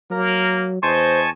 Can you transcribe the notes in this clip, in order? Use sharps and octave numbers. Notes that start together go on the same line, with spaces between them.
F#3 A#3 A#4
E2 C5 D#5 G#5 A5 C#6